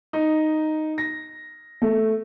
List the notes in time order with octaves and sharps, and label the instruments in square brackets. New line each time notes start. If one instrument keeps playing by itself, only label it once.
[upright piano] D#4
A#6
A3